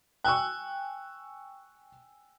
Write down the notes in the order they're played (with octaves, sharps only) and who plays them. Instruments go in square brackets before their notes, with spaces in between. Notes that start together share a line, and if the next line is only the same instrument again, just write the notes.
[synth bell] G5 G#5 [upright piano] C#6 E6 F#6